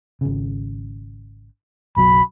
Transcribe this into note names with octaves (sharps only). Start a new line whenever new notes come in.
G#1 C#3
F#1 B1 F#3 B5